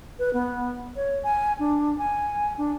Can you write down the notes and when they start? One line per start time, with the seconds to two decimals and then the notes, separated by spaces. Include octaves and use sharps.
0.19 B4
0.33 B3
0.96 C#5
1.24 G#5
1.59 D4
1.99 G#5
2.58 D4